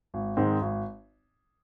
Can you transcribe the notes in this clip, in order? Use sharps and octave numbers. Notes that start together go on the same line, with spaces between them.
G#1
G#2 D#3 G#3 C4
G#1